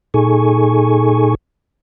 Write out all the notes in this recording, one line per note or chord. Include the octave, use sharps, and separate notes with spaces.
A#2 D#4 G#4 A4 G#5 C#6